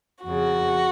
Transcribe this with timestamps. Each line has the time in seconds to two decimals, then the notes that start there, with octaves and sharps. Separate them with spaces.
0.24 F2 C#3 F#4